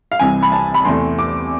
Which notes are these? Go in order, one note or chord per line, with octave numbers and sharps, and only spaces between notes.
F5
C2 C3 E3 G#5
B5
A5
B5
E2 C3 E3 A3 C6
D6